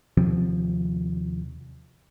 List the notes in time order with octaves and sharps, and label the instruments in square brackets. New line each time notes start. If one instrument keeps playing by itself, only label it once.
[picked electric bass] D#2 C3 F3 C4